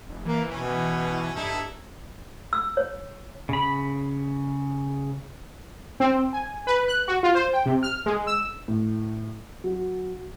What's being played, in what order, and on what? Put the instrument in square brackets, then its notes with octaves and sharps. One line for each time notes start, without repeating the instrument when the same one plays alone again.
[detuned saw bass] F1
[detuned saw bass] E3 [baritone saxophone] A#3
[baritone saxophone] B2 [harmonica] C#4
[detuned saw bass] G2 [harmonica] D#4 E4 A4
[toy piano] E6
C#5
[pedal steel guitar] C#3 B5
[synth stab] C4
G#5
B4
F#6
F#4
F4
C5
G5
C3
F6
G#3
E6
[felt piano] A2
F#3